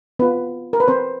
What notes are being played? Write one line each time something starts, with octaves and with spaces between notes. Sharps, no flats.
B3 C4 F4 B4
A#4
B4
C4 C5